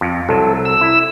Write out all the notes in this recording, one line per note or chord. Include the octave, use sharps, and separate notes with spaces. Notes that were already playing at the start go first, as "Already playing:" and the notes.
F2
C2 F#3 A4
E6
E4